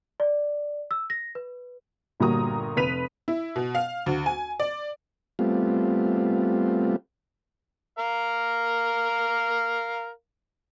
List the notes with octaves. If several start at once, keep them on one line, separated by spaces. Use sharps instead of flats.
D5
E6
A#6
B4
G1 A#2 G3 F#4 A#5 D#6
F1 B4 B6 D#7 F7
E4
B2
F5
D2
G#5
D5
G3 A3 B3 C4 F4
A#4 F5